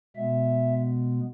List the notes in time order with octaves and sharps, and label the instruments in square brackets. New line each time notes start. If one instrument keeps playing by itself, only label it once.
[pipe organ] B2 G#3 B3 E5